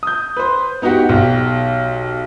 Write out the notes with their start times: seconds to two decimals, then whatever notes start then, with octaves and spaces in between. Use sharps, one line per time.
0.03 D#6 G6
0.37 B4 C5
0.82 B3 D#4 F#4 G4 F#5
1.09 B1 G4